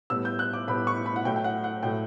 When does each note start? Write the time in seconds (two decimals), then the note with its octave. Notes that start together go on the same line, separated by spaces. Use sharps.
0.10 A2 G3 B3 E6
0.25 G6
0.39 F#6
0.53 D6
0.68 A2 G3 B3 B5
0.87 C#6
1.06 B5
1.16 F#5
1.25 A2 F#3 A3 G5
1.36 G5
1.44 F#5
1.64 F#5
1.83 A2 F#3 A3 G5